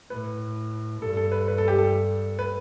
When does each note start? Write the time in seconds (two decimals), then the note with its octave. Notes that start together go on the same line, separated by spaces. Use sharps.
0.10 A2 B4
1.02 G2 A4
1.17 A4
1.32 B4
1.48 B4
1.58 A4
1.68 G4
1.78 A4
2.39 B4